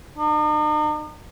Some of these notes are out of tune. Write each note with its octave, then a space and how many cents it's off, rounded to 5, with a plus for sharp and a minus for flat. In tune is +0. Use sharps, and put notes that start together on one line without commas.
D#4 -45